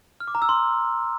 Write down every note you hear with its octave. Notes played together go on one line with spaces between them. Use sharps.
F6
D6
A#5
E6
C6